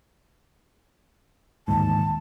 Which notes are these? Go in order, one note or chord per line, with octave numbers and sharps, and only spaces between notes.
D1 D#2 G#2 A5